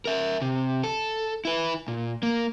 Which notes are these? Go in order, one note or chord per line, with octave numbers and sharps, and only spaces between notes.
A#4 E5
C3
A4
E4 B4
A#2
A#3